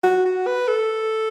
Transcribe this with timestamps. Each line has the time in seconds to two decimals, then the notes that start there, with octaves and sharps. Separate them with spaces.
0.03 F#4
0.25 F#4
0.47 B4
0.68 A4